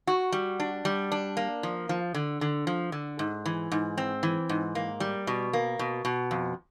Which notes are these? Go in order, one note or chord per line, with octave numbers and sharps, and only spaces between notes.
F#4
G3
D4
G3
D4
A#3
F3
F3
D3
D3
F3
D3
G#2
E3
G#2
C4
E3
G#2
A#3
G3
B2
A#3
B2
B2
F2